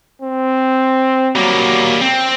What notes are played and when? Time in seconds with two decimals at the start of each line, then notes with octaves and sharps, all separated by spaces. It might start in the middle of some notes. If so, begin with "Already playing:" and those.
0.22 C4
1.36 F#3 G3 A#3
2.01 C4